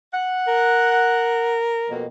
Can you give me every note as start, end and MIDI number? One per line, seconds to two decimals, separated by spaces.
0.13 1.56 78
0.47 1.97 70
1.90 2.06 41
1.90 2.06 47
1.90 2.06 58